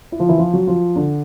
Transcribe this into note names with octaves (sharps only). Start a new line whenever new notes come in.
E4
F3 F4
E3 E4
F3 F4
F#3 F#4
F3 F4
D3 D4